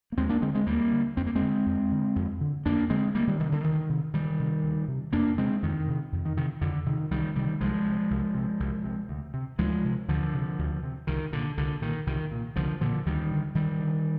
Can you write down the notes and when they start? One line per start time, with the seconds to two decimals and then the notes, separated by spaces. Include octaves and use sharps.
0.12 A#3
0.17 D#2 G#3 C4
0.29 A#3 D4
0.42 D3 G#3 C4
0.55 G#3 C4
0.66 D#2 G3 A#3
0.92 D3
1.17 F2 C4
1.26 A#3
1.35 G#3 C4
1.41 D3
1.66 F2
1.92 D3
2.16 F2
2.41 D3
2.66 F2 A#3 D4
2.89 D3 G#3 C4
3.14 D2 G3 A#3
3.27 D#3 G3
3.39 C3 D#3
3.52 D3
3.64 D2 D#3
3.89 C3
4.14 D2 D#3 G3
4.39 C3
4.64 D2
4.88 C3
5.13 F2 A#3 D4
5.38 C3 G#3 C4
5.63 F2 D#3
5.88 C3
6.12 F2
6.25 D#3
6.37 C3 D#3
6.61 F2 D3
6.86 C3 D#3
7.11 C2 D#3 G3
7.36 C3 D#3 G3
7.61 C2 F3 G#3
7.86 C3
8.10 C2
8.35 C3
8.60 C2
8.84 C3
9.09 D2
9.34 C3
9.59 D2 F3 G#3
9.84 C3
10.08 D2 D3 F3
10.34 C3
10.59 D2
10.83 C3
11.07 C2 D#3
11.33 A#2 D3
11.57 C2 D3
11.81 A#2 D#3
12.07 C2 D#3
12.32 A#2
12.56 C2 D3 F3
12.81 A#2 D3 F3
13.06 D2 D#3 G3
13.31 D3
13.55 D2 D#3 G3
13.80 D3